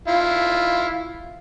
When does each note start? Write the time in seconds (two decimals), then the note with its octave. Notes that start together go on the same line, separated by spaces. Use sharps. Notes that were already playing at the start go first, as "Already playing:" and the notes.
0.08 E4 F4